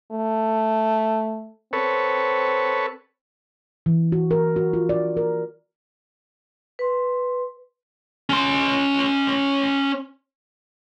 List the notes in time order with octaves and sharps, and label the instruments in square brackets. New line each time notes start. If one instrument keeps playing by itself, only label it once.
[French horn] A3
[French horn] C4 [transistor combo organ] A4 B4 C#5
[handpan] E3
F#4
A#4
F#4
F4
D5
A#4
[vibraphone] B4 C6
[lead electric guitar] C#4 C6